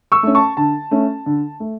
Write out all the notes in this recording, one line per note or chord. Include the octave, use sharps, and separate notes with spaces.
C#6 E6
A3 C#4
A5 C#6
D3 A5
A3 C#4
D3
A3